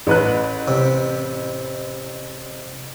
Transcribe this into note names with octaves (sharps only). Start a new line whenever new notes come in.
A1 B4 F#6
C3